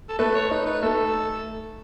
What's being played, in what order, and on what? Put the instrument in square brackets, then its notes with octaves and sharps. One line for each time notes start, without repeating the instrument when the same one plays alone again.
[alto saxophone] A4
[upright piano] A3 [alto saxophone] B4
[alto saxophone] C#5
[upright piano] D#4 [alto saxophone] B4
[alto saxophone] B4
[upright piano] A3 [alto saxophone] A4